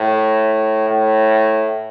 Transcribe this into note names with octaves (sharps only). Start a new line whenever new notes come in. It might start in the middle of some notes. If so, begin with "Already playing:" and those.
Already playing: A2
A2